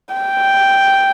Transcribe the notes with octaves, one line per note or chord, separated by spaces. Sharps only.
G5